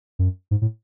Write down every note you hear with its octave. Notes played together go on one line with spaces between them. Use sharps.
F#2
G#2
A2